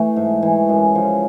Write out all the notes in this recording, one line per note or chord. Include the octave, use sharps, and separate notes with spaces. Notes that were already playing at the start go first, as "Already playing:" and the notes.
Already playing: E3 A3
G#2
E3
F#2 G#3
C#3 F3